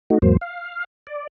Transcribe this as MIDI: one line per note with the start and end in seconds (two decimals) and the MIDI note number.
0.10 0.18 57
0.10 0.18 63
0.10 0.18 66
0.22 0.37 40
0.22 0.37 44
0.22 0.37 54
0.22 0.37 58
0.22 0.37 72
0.41 0.84 77
1.07 1.27 74